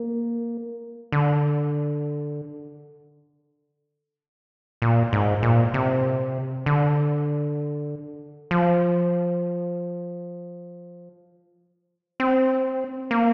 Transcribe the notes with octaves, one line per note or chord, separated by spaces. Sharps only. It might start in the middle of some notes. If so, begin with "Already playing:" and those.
Already playing: A#3
D3
A#2
G#2
A#2
C3
D3
F3
C4
A#3